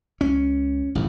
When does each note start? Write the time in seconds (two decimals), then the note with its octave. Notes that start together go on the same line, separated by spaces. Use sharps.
0.21 C#2 C#4
0.95 A1 G#2 C#3